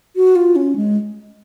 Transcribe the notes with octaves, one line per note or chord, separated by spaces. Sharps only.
F#4
F4
C#4
G#3